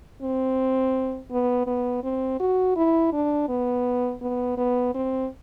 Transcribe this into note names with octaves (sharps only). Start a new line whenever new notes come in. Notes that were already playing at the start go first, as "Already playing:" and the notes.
C4
B3
B3
C4
F#4
E4
D4
B3
B3
B3
C4